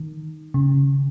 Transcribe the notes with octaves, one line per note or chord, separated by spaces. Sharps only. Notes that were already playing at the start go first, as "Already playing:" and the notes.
Already playing: D#3
C#3